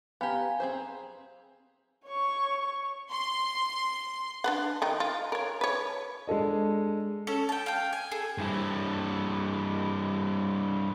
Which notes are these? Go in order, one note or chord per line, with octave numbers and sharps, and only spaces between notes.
B3 G4 F5 G#5 A#5
C4 G#4 C5
C#5 C#6
C6
D4 B4 F#5
D#3 D#4
F4
A#4 C#5
B4 C#5
G#3 D4 A4 D#5
C#4 A4
G5 A5
F5 G5
G#5
G#4 A4
G2 E4